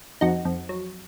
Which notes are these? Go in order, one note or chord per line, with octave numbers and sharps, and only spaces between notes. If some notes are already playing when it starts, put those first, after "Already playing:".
F2 D#4 F#4
F2
F#3